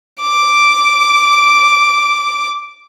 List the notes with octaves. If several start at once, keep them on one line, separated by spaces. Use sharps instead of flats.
D6 D7